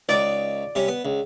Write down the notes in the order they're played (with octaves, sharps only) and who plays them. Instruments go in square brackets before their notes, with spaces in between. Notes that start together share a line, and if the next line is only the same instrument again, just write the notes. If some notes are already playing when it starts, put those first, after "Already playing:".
[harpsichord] C#2 D#4 C#6 [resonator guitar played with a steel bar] D5
[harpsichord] C3 G3 C#4
B3
C#2